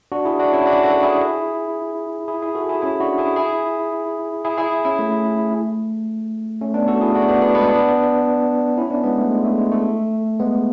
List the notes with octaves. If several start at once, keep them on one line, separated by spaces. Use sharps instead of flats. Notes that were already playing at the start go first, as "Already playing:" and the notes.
D4 F#4
E4 G#4
D4 F#4
C#4 E4
D4 F#4
F#4 A4
E4 G#4
E4 G#4
E4 G#4
F#4 A4
E4 G#4
C#4 E4
D4 F#4
E4 G#4
E4 G#4
E4 G#4
E4 G#4
C#4 E4
A3
A3 C#4
B3 D4
F#4 A4
E4 G#4
D4 F#4
B3 D4
B3 D4
G#3 B3
B3 D4
C#4 E4
B3 D4
G#3 B3
A3
G#3
A3
G#3
A3
G#3 B3